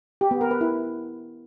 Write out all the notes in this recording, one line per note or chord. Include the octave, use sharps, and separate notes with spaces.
G4
B3
A#4
B4
E4